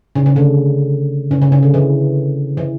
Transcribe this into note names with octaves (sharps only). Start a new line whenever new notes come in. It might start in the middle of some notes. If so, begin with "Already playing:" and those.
C#3
C#3
D3
C#3
C#3
C#3
D3
E3
E3